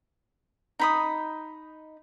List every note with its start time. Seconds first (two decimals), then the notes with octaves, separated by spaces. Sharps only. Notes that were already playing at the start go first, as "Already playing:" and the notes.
0.79 D#4 B5 D#6